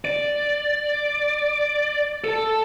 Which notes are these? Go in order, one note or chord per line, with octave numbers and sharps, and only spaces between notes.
D5
A4 A5